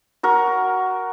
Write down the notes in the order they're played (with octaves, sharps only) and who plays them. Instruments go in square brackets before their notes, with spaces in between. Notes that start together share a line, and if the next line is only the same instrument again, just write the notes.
[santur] F#4 A#4